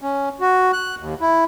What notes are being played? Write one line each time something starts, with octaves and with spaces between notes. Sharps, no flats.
C#4
F#4
F#6
D#2
E4